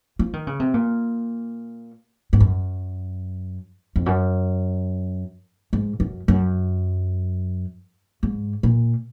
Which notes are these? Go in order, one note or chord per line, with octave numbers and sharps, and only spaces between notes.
F3
D#3
C#3
C3
A#2
G#2
F#2
F2
F#2
G#2
F#2
F#2
G#2
A#2